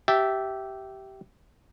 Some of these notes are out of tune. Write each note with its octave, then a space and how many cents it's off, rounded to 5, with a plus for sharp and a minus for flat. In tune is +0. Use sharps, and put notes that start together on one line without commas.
G4 -15 E5 +0 A5 +0